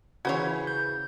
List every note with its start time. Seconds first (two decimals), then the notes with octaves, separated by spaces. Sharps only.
0.25 C#3 E3 F#4 C5 C#5 G#6
0.67 G6